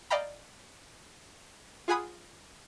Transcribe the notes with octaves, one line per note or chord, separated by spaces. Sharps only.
D5 D#5 F5 G5 A#5 B5
F4 G#4 F#5 G#5 B5 D#6